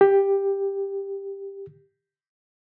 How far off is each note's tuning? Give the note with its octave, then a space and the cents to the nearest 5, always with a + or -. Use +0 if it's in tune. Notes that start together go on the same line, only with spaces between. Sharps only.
G4 +10